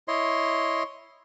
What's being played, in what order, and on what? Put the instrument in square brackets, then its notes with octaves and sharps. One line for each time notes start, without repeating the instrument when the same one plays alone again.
[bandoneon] E4 C#5 D#5 C6